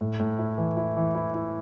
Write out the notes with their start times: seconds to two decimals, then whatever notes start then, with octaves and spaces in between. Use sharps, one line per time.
0.01 A2
0.19 A2
0.39 E4
0.58 E3
0.77 E4
0.97 E3
1.15 E4
1.34 E4